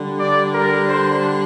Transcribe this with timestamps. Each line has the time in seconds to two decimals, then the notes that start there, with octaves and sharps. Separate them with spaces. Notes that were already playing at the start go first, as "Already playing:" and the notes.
Already playing: D3 G3
0.18 D5
0.54 A#4
0.89 C5